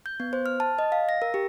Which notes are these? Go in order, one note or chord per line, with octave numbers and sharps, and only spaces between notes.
G6
B3
C5
F6
A5
D#5
F5
A#6
A#4
G4